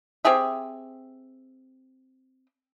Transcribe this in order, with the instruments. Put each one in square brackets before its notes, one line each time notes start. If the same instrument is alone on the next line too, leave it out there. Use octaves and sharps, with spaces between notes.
[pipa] C4 G4 G#4 E5